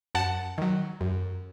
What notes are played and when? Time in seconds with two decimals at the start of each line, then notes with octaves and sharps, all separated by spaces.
0.15 F#2 F#5 A5
0.58 D#3 F#3
1.01 F#2